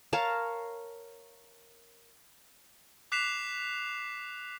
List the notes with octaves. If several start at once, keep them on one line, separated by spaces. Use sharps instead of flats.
A#4 C#5 F5 A5
D6 F#6 B6 C7 E7 F7